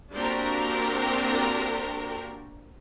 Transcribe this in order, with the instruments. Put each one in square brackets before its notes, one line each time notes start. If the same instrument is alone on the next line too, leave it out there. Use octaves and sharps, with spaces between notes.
[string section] A#3 C4 D4 F#4 G4 A#4